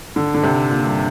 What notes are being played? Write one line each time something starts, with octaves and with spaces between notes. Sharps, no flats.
D3
D3
C3
A#2
G2